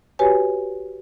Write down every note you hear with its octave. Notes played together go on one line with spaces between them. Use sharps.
F#4 G4 B4 C#5 G#5